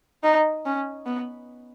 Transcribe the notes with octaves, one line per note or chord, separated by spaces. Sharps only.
D#4
C#4
B3